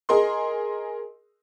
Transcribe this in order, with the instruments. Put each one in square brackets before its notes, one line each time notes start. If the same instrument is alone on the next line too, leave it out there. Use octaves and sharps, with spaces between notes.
[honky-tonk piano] G#4 A#4 D#5 C6